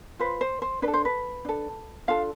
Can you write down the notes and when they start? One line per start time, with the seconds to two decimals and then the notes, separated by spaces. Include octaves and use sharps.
0.19 F4 B4 C5
0.41 C5
0.62 C5
0.82 D4 B4
0.88 A4
0.93 C5
1.05 B4
1.45 D4 A4
2.08 D4 F4 A4 F5